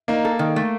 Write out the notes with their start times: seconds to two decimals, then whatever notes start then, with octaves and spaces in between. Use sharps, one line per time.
0.08 A#3 D#4
0.25 A4
0.39 D#3
0.56 A3